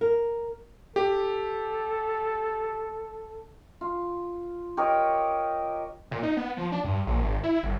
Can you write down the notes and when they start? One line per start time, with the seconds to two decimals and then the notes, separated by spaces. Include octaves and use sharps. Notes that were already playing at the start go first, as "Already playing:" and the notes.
0.01 A#4
0.96 G4 A4
3.81 F4
4.77 G4 A#4 C#5 D#5
6.11 A#2
6.23 D#4
6.37 B3
6.57 F3
6.72 D4
6.84 G2
7.07 A#1
7.21 G#1
7.44 E4
7.63 G1